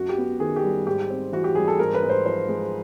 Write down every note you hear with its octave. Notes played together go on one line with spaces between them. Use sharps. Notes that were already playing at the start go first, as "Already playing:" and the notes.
Already playing: F#2 F#4
G4
B3
D#3 G#4
G4
G3
G#2 G4
C4
E3 F#4
G4
G3 G#4
A4
G#2 A#4
B4
G#2
C5
F3 C5
G#3